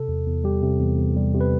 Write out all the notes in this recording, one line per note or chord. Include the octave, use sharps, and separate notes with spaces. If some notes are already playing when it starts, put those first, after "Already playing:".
Already playing: C3 A4
E2
E2
G3 G4
C3
E2
E2
G3
C3
B4